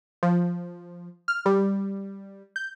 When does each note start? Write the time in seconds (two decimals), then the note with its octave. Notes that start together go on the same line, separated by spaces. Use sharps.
0.23 F3
1.28 F6
1.46 G3
2.56 G6